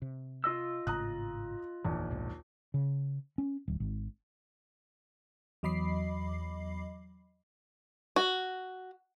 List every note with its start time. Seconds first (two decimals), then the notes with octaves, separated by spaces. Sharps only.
0.02 C3
0.44 F4 D#5 E6
0.87 G#1 A2 C#3 A#5 D#6 F#6
1.85 F1 A#1 D#2 E3
2.11 B1 G#2
2.74 C#3
3.38 C#4
3.68 D1
3.80 G#1
5.63 E2 F#3 D#5 B5 D6 C7
8.16 F#4